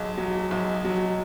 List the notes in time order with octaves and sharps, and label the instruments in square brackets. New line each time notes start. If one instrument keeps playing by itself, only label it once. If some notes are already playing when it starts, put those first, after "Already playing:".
Already playing: [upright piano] B1 [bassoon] G#3
[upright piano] F#3
B1
F#3